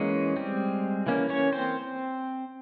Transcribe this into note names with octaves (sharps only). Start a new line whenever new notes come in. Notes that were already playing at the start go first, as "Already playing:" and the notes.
Already playing: E3 G#3 A#3 C#4 G#4
G3 C4
E3 A#3 C#4
C#4 C#5
C4 C5